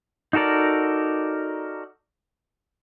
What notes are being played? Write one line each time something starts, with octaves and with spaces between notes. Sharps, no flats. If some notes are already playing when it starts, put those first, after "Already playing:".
D#4 F#4 A4 A#4 D5